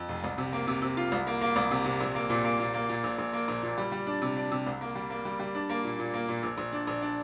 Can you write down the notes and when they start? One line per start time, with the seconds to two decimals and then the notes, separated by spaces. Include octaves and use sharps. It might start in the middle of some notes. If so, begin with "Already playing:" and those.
Already playing: F2
0.09 F1
0.24 C2
0.38 C3
0.52 A#3
0.67 C3
0.82 C3
0.97 F4
1.12 C2
1.27 A#3
1.41 A#3
1.56 C2
1.71 C3
1.85 C3
2.00 A#1
2.15 A#3
2.30 A#2
2.44 A#3
2.60 A#2
2.74 A#3
2.89 A#2
3.04 A#1
3.18 A#1
3.33 A#3
3.48 A#1
3.63 A#2
3.78 G3
3.92 G3
4.07 D4
4.22 C3
4.37 D4
4.51 C3
4.67 C2
4.81 A#3
4.95 G3
5.10 A#3
5.25 G3
5.39 G3
5.55 D4
5.70 A#3
5.84 A#2
5.99 A#2
6.14 A#3
6.29 A#2
6.43 A#1
6.58 A#1
6.73 D4
6.87 A#1
7.02 D4